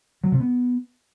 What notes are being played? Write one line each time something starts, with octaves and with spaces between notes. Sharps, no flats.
F#3
C3
B3